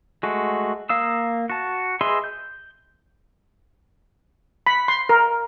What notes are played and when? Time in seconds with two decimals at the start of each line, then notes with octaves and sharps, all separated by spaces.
0.23 G#3 A3 F#4
0.89 A#3 F5 D#6 E6
1.50 F#4 A5
2.01 G#4 B4 D#5 E5 C6
2.24 G6
4.67 B5
4.88 C6
5.09 A#4